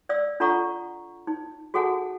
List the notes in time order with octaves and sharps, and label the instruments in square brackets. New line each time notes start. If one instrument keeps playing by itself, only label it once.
[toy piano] D5 F5 E6
D4 F4 A4 F#5 A#5 C#6
D#4
F#4 G#4 A4 F#5 G#5 A5